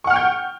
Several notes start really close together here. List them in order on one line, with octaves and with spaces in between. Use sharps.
C#6 F#5 F6 G5 G6